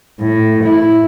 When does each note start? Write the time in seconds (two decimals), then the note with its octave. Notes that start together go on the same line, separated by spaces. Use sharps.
0.20 A2
0.65 E4